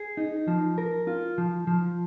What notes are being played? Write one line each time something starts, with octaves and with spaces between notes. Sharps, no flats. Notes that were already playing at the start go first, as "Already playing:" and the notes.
Already playing: G#4
D#4
F3
A#4
F4
F3
F3